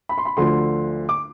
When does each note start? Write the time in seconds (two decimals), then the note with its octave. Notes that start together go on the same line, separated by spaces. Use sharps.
0.09 B5
0.18 C6
0.25 B5
0.37 D2 D3 F3 C6
1.09 D6